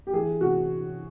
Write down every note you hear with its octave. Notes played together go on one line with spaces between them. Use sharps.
G4
E3 G#4
C3 F#4